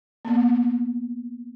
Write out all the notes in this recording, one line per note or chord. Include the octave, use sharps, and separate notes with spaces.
A#3 B3